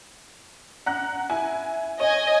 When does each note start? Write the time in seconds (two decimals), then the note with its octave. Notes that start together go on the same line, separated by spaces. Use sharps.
0.86 F#5 A#5 F#6
1.30 E4 G#5
2.00 C#5 D#5 G#5